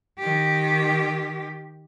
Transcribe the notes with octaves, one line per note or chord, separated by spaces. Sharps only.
D#3 G4